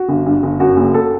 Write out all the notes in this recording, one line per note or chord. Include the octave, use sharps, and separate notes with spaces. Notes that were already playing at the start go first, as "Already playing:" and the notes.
Already playing: F#4
G1
G2
G1
F#2 F#4
F#1
A4